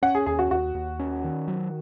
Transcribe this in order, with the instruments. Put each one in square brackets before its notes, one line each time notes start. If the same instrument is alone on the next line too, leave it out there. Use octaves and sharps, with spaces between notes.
[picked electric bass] C#4 [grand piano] F#5
[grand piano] G#4
[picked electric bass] D#2 [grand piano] G#4
[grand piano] F#4
[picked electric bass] D#2 [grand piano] F#4
[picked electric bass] D#2
C#4
D#3
F#3